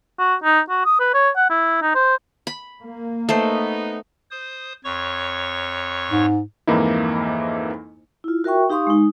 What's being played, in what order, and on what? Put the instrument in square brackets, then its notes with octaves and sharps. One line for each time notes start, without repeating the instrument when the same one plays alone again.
[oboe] F#4
D#4
F#4
D#6
B4
C#5
F#5
E4
D#4
C5
[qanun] B5
[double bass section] A#3
[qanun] A3 C5 [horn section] B3 D#4
[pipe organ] C5 D#6
F2 C#5 C#6
[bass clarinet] G#2
[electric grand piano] F2 G#2 E3 A#3 D#4 E4
[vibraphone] E4 F4
F#4 A#4 E5 G5 C#6
D#4 G4 F5 C6 C#6 D#6
G#3 D#4